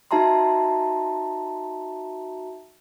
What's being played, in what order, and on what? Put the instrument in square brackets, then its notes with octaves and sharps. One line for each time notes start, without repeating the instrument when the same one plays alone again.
[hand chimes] D#4 F#4 E5 A5 A#5 C6